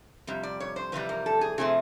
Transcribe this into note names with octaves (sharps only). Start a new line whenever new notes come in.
F2 C3 G3
D5
C#5
C5
F2 C3 E3 G3 B4
A#4
A4
G#4
C3 F3 A3 C4 G#4